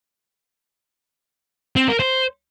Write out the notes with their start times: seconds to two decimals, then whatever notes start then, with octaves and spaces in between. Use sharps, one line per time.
1.76 C4
1.88 A#4
2.00 C5